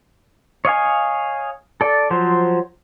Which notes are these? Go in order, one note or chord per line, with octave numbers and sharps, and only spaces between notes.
C#5 D#5 F5 G#5
A4 D5
F3 F#3 C5